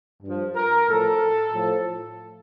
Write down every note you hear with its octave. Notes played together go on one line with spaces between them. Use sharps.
G2 F3
A#4
A2 F3 A4
A2 F3